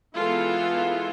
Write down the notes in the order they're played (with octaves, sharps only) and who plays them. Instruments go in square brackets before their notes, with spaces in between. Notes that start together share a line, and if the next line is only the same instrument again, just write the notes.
[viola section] E3 G#3 B3 F4 A4